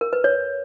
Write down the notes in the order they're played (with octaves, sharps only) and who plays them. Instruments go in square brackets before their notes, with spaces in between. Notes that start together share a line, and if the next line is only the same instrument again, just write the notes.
[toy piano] A#4
B4
C#5